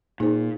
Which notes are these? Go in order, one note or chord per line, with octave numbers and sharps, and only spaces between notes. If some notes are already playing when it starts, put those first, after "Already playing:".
A#2 D#4 G#4 C5